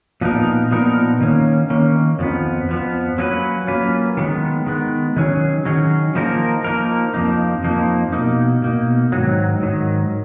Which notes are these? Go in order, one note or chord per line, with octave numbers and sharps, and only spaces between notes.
A#2 F3 B3 D#4 A#4
A#2 F3 B3 D#4 A#4
D#3 A#3 C#4
D#3 A#3 C#4
F2 F3 B3
F2 F3 B3
F#3 A#3 C#4 F4 B4
F#3 A#3 C#4 F4 B4
D#3 G#3 B3
D#3 G#3 B3
D#3 F#3 C#4 G#4
D#3 F#3 C#4 G#4
F3 A#3 D#4 A#4
F3 A#3 D#4 A#4
F2 F3 A#3 D#4
F2 F3 A#3 D#4
B2 A#3 D#4
B2 A#3 D#4
G#2 D#3 F#3
G#2 D#3 F#3